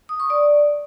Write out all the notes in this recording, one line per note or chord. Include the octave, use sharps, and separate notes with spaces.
D#6
C#6
D5